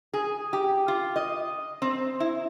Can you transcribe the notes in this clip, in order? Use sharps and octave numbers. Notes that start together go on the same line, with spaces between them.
G#4
G4
F4
D#5
C4
E4